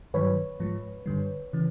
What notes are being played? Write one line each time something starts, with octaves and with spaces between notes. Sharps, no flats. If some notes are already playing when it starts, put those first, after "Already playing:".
G2 D#3 F#3 B4 C#5
G#2 F3 G#3
G2 D3 G3
C#3 E3